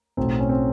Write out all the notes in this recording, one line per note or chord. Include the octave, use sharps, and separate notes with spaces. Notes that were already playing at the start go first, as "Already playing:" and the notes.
B1 A2 F#3 C4
C#4
C4